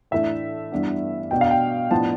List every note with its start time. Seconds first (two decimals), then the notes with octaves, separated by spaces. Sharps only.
0.11 A2 E3 A3 D4 E5
0.72 G2 E3 B3 D4
1.31 B2 B3 D4 G5
1.41 F5
1.51 G5
1.91 A2 F3 B3 D4 A5